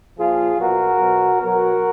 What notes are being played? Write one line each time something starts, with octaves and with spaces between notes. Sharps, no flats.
A#2 F3 F4 G#4
B2 F#3 F#4 A#4
B2 F#3
B2 F#3 F#4 A#4